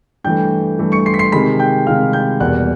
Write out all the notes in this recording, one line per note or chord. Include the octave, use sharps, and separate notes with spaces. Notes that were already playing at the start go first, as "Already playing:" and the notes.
G2 E3 A3 G5 G6
G2 E3 A3
C#6 C#7
C6 C7
B6
C6 C7
C3 D#3 G#3 B5 B6
G5 G6
C3 D#3 G#3 F5 F6
G5 G6
E2 B2 G3 A#3 F#5 F#6